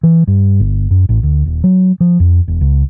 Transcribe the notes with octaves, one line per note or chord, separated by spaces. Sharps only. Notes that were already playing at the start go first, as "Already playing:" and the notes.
E3
G2
G1
F#2
A1
D2
D#1
F#3
F3
F2
E1
C#2